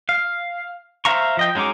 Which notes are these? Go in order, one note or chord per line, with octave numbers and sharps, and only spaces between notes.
F5
C5 E5 F5 A#5 C#6
F3 D#5 G5
F#3 G#3 C#4 D#4 D6